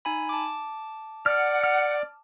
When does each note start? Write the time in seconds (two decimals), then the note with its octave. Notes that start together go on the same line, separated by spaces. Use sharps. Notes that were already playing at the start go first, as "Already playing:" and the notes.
0.05 D#4 G#5 B5
0.29 A5 D6
1.26 D5 F#5 F6
1.64 F6